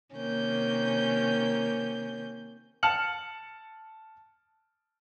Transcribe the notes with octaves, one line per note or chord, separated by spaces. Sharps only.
C3 D#3 A#3 C#4 G6
A5 F6 C#7 F#7